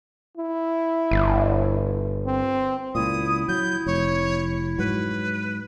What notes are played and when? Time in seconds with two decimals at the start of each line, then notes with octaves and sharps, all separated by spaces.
0.38 E4
1.11 G1
2.26 C4
2.95 C#2 A#2 E4 D#6
3.49 F#3 G6
3.86 F1 C#5
4.78 G#2 F#3 B4